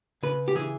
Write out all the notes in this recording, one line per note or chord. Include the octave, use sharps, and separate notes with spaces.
C#3 B4
G4
E3 G#4